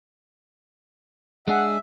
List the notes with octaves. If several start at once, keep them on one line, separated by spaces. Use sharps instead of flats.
G#3 D4 G#4 E5 F#5